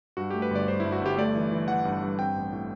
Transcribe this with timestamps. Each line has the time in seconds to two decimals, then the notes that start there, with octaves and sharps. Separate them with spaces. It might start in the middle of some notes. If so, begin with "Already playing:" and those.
0.17 G2 F#4
0.30 A3 G4
0.42 B4
0.51 G1 D5
0.68 G1 C5
0.80 G2 E4
0.92 F#4
1.02 G1 G4
1.17 A3 D5
1.35 E3
1.52 E3
1.68 E3 F#5
1.85 G2
2.02 G2
2.19 C4 G5
2.36 A1
2.53 A2